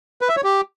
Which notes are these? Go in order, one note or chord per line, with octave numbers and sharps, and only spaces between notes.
B4
E5
C#5
G4